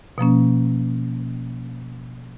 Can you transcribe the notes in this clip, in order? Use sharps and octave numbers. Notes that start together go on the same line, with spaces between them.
B2 F3 A#3 C#4